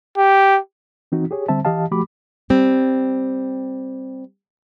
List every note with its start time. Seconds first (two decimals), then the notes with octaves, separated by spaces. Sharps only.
0.17 G4
1.12 E3 C4 D#4 F#4
1.31 G4 G#4 C#5
1.48 D3 G3 C4 C5 E5 A5
1.65 E3 G4 D#5 F5 A5
1.91 F3 A3 F#4 G4 B5 D6
2.50 G3 C4